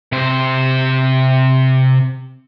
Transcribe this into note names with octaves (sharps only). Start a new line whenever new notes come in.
C3 C5